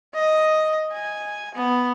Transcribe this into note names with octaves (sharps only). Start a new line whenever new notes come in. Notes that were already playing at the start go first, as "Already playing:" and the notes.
D#5
G#5
B3